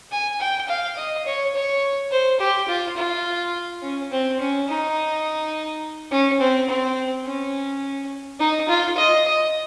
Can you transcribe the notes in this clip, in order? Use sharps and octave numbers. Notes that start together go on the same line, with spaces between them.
G#5
G5
F5
D#5
C#5
C#5
C5
G4
F4
F4
C#4
C4
C#4
D#4
C#4
C4
C4
C#4
D#4
F4
D#5
D#5